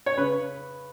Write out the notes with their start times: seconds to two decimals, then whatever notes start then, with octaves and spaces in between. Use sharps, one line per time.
0.06 C#5
0.17 C#3 B4